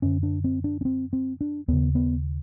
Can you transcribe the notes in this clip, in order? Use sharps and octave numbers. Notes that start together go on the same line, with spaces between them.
F#2 D3 C#4
D4
C4
D4
C#4
C4
C4
D4
D#2 C#3 B3
B3